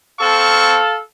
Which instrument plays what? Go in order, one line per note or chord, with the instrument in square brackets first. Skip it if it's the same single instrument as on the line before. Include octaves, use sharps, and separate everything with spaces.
[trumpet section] C4 C#6 [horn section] A4 F5 A5